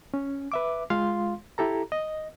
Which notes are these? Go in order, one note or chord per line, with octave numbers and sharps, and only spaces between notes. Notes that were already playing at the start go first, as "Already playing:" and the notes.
C#4
B4 E5 D6
G#3 F4 F5 C6
E4 G4 A4 A#5
D#5